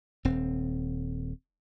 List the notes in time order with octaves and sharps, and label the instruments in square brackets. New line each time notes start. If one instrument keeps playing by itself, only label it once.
[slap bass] D#1 C4